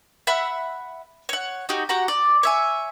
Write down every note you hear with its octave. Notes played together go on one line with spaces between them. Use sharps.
E5 F#5 B5 F#6
C#5 F#5
D#4 F#4 G4
F#4 G4 F#5 A#5
D5
C#5 E5 G#5